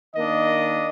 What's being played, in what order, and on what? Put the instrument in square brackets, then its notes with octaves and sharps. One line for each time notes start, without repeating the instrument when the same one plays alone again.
[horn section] D#3 A#3 D4 D#5